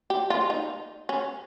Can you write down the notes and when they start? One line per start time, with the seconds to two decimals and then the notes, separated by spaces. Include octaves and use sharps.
0.10 G4
0.30 F4
0.50 D#4
1.09 C#4